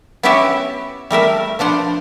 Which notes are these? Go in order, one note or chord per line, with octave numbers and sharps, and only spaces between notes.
B3 C#4 E4 F#4 G4 E5
G3 A3 A#4 E5
F3 B3 D4 C5